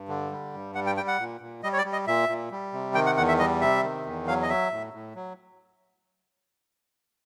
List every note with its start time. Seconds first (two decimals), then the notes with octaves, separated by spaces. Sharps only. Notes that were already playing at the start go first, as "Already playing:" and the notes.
Already playing: G2
0.08 D3
0.32 G3
0.53 G2
0.75 G3 F#5
0.86 G5
0.97 G3 G5
1.08 F#5
1.19 A#2
1.41 A#2
1.63 G3 D#5
1.73 C#5
1.78 D5
1.85 G3
1.92 D#5
2.07 A#2 E5
2.29 A#2
2.51 G3
2.73 C3
2.95 D#3 G5
3.06 F#5
3.17 E2 F#5
3.28 E5
3.39 G3 D#5
3.61 C3 E5
3.83 D#3
4.06 E2
4.27 F#3 F5
4.43 D#5
4.49 F#3 E5
4.71 A2
4.93 A2
5.15 F#3